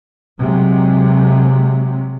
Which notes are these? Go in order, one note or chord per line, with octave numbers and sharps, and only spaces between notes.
C3 F#3 G#3